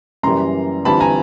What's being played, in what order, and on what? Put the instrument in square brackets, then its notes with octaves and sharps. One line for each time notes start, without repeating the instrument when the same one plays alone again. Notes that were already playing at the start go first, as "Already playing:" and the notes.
[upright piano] F#2 C#3 E3 G3 A#3 A#5 C6
G1 G2 E3 G3 C4 A5 B5
G#5 A#5